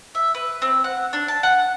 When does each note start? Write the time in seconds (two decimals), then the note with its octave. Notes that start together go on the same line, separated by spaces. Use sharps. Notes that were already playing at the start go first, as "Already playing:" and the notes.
0.15 E5
0.35 B4
0.62 C4
0.84 F#5
1.13 D4
1.28 A5
1.43 F#5